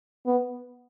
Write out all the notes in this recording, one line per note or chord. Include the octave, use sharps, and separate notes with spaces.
B3